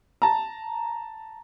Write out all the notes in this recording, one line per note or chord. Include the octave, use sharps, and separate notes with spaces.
A5 A#5